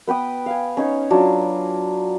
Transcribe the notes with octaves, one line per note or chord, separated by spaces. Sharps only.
B3 B4 G5 D#6
F5 G#5
C#4 D#4 C#5
F#3 D4 F4